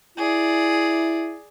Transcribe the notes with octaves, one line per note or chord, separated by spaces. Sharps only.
E4 G#4 D5